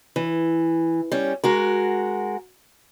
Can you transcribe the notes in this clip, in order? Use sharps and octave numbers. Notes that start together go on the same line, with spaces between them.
E3
G3 C#4
G#3 F#4 A#4